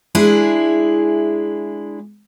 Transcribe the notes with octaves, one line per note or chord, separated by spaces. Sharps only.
G#3 D4 E4 G#4